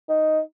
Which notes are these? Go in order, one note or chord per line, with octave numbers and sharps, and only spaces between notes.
D#4